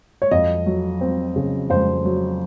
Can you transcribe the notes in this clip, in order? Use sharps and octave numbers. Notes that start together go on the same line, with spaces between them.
C#5
F2 D#5
F#3
C4
C#3
F2 C5
F#3